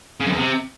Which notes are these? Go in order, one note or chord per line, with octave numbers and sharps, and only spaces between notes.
C#3
F#2
E2
C3